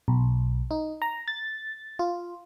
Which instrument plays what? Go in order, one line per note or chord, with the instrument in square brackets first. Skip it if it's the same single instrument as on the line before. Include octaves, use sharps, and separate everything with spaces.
[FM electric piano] B1
D#4
A#5
A6
F4